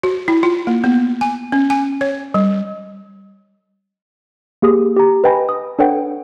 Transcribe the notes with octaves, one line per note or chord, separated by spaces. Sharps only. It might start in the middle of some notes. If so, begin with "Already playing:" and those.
F#4
E4
F4
A#3
B3
G#5
C#4
G#5
C#5
G3
A#3 G4 G#4 D#6
G4 A#5
B4 D#5 G5 G#5 B5 A#6
D#6
D4 A4 B4 C#5 F#5 G5